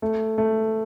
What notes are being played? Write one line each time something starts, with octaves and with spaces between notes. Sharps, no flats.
A3
A3